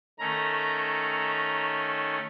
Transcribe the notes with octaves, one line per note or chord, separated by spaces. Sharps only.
D#3 A3 C#4 A#5